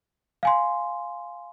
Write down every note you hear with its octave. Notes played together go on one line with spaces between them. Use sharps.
F5 G#5 C6